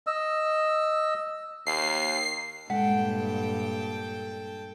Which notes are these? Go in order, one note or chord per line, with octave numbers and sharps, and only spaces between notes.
D#5 E6
D#2 C7
G2 A#2 G#3 A4 F#5 G5